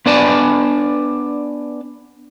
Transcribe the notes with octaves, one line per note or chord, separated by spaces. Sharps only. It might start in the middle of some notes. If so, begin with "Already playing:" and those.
B3 D4 B4 D5 G#5 A5